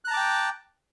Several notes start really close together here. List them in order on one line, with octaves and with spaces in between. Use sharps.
F#6 A#5 A5 D6 G5